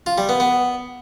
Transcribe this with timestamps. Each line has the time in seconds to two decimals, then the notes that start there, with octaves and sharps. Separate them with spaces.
0.06 F4
0.18 G3
0.29 B3
0.40 B3